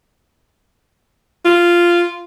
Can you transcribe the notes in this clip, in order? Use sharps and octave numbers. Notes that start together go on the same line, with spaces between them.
F4